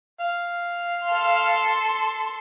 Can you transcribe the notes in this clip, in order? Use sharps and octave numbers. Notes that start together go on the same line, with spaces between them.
F5
A4 C6